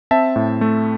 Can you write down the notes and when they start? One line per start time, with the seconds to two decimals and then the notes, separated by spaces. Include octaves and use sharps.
0.11 C4 E5 A5
0.36 A2
0.61 A3